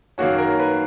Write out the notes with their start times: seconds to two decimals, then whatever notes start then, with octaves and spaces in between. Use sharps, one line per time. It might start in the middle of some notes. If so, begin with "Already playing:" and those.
0.18 F#2 D#3 A#3 C#4 F#4
0.38 A#4
0.60 B4